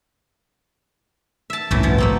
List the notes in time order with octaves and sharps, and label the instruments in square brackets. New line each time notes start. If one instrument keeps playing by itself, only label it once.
[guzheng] E5 A5
[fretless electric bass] G1 C2 A2 [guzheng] F#2 E3 A3
[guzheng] B2 F3
A3 A#3 C4